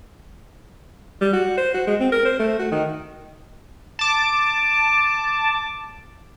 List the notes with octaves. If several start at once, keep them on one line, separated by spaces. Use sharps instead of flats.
G3
F#4
C5
F#4
G#3
C4
A#4
C5
A3
F#4
D#3
A5 D6